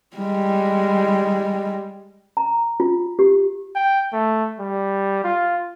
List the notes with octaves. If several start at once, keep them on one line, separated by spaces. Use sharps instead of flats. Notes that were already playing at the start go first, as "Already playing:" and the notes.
G3 G#3
A#5
F4
G4
G5
A3
G3
F4